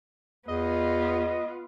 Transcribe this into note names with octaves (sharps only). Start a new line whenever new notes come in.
E2 B3 F4 D#5